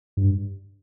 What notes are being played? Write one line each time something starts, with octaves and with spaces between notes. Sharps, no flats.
G2